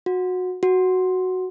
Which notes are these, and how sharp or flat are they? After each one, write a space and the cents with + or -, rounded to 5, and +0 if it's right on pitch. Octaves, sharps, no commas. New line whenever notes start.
F#4 -20
F#4 +0